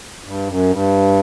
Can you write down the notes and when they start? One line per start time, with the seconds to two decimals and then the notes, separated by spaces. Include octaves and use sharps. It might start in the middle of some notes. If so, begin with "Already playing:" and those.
0.24 G2
0.47 F#2
0.70 G2